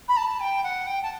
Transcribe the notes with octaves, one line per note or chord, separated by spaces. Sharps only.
B5
A5
G5
F#5
G5
A5